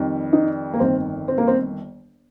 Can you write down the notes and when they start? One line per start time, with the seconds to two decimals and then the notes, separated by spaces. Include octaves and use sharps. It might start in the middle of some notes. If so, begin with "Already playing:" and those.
Already playing: F2 D#3 G3
0.33 D#4
0.74 A#3
0.80 G1 F2 D#3 C4
1.28 C4
1.38 A#3
1.48 C4